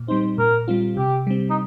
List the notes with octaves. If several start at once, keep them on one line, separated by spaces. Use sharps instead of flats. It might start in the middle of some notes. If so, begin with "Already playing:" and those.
Already playing: A#2
G3 C4 D#4 C5
A#2 A#4
G3 C4 F4
C3 G4
G3 C4
D#4